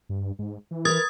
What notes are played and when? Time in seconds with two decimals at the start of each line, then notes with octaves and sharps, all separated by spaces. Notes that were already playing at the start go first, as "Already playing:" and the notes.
0.09 G2
0.39 G#2
0.71 E3
0.85 A#4 B4 D#6 G#6 A6